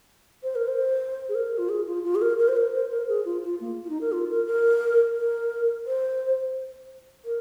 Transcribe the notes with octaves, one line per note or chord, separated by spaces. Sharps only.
C5
A#4
C5
G#4
A#4
F4
G#4
F4
F4
G#4
A#4
A#4
C5
A#4
C5
A#4
G#4
F4
F4
A#3
F4
D#4
A#4
F4
A#4
A#4
A#4
C5
A#4